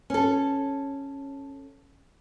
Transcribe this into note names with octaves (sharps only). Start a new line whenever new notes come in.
C#4 A4